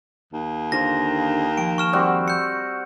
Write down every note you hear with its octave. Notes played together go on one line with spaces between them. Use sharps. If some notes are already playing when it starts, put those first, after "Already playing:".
D#2
D3 F4 C5 A#6
F3 G5 D7
C#6 F6 E7
G3 C4 F#4
G6 C#7